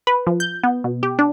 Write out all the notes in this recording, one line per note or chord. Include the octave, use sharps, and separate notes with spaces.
B4
F3
G6
B3
B2
G4
D4